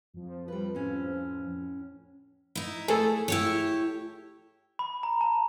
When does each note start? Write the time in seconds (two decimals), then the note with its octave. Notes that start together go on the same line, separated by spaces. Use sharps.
0.14 F2 F3
0.48 G3 B4
0.75 A2 C#4
2.55 D#4 E4
2.88 A3 G#4 A4
3.28 E4 G4 C#5
4.79 B5
5.03 A#5
5.21 A5